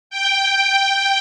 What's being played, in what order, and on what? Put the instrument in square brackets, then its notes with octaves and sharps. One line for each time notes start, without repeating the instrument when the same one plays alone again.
[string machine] G5